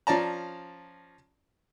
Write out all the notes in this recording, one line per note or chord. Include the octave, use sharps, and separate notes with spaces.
F3 C#4 D5 A5 A#5